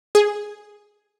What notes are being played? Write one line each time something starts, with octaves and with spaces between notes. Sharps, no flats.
G#4